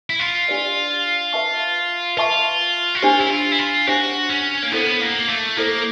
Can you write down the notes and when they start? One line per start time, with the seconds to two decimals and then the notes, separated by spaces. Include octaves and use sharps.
0.10 E4
0.19 F4
0.47 D4 G4 B4 D5 F5
1.33 B4 E5 A5 C#6
2.17 F4 B4 E5 A5 C#6
2.95 F#4
3.02 D4 F4 G4 C5
3.20 E4
3.30 F4
3.52 E4
3.59 F4
3.87 D4 F#4 G4 C5
4.29 C#4
4.63 A#3
4.72 B3 E4 A4 C5
5.01 A#3
5.29 A3
5.57 A#3 E4 A4 C5